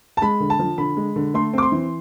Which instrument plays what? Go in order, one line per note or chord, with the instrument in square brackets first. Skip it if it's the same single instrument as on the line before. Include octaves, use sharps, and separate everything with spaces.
[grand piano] A5
G#3 B5
D3
A5
F3
D3 B5
G#3
D3
A3 C6
C4 D6
C6
E3